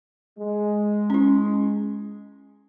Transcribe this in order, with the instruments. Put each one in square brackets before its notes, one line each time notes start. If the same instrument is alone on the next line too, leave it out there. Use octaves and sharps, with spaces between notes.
[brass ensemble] G#3
[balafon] C#4 E4